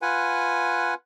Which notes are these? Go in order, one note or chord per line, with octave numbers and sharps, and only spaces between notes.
F4 B4 F#5 G#5